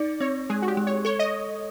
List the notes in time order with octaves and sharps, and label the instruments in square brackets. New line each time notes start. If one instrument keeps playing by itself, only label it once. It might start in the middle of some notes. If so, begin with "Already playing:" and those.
Already playing: [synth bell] D#4 [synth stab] D5
[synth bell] C4 [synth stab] C#5
[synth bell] G#3 [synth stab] G#4
[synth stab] F#4
G4
[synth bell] G#3
[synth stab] C#5
[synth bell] A4 [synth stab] C#5
[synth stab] D#5